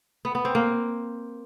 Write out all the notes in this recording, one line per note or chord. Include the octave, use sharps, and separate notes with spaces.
B3
B3
C4
A#3